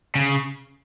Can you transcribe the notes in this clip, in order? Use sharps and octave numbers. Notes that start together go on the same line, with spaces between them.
C#3